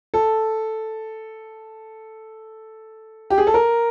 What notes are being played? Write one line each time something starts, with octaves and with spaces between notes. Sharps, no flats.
A4
G4
G#4
A4
A#4